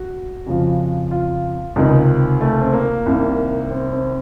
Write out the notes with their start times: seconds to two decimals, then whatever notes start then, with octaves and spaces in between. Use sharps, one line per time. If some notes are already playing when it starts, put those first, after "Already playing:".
Already playing: F#4
0.46 F2 C#3 F3
1.11 F4
1.76 C#2 C3 D#3 D#4
2.41 A3
2.61 C4
2.73 A#3
3.06 C2 C3 D#3
3.71 C4
3.92 C4